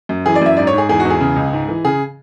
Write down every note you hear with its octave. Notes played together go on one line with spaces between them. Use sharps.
F#2
E3 G#4
D5
F#2 E5
G#2 D5
C#5
G#2
G#4
E2 G#4
F#4
E2
G#4
C#3
C#2
G#2
E3
C#3 G#4